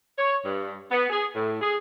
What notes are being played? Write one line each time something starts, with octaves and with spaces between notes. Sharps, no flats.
C#5
G2
B3
G#4
A2
G#4